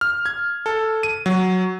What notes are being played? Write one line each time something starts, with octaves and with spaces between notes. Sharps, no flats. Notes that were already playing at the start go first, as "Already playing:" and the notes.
F6
G#6
A4
D#7
F#3